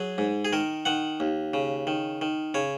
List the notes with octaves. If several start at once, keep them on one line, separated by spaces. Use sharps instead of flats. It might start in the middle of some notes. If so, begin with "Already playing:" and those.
Already playing: F#3 G#4
G#2
G#4
D#3 A#4
D#3 F#5
D#2
C#3
D#3
D#3
C#3 C#5